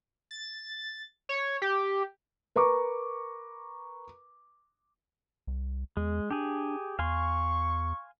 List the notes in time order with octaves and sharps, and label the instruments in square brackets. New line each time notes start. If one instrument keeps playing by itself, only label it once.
[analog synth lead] A6
C#5
G4
[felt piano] A#4 B4 A#5 C#6 D6
[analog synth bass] C2
[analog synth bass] E2 [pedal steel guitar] G#3
[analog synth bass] D4 [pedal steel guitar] G4 G#4
[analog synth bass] E2 [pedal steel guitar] F5 G#5 C6 [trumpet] C#6